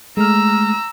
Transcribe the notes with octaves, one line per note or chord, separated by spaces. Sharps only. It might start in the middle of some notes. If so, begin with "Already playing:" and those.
G#3 A3 A#5 E6 F6